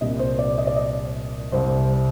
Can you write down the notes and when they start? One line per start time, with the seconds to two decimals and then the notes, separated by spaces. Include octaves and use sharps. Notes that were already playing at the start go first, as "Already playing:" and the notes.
0.01 C2 A#2 G3 D#5
0.19 C5
0.39 D5
0.58 D#5
0.67 D5
0.76 D#5
1.52 C2 C3 G3 C5